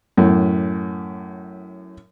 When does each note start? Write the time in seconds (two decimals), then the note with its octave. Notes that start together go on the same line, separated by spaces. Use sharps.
0.18 F#2 A2